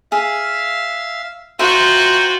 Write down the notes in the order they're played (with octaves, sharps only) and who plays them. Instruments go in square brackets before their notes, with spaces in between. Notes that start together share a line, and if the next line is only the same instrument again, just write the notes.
[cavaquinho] G#4 [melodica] E5 F5
[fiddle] F4 F#4 [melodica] C5 G5 A#5 [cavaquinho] E5 C6